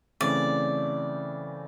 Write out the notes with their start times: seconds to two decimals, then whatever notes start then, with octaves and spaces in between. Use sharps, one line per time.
0.21 C#3 E3 A3 C4 D5